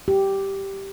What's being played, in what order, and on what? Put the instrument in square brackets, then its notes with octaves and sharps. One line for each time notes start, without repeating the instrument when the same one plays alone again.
[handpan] G4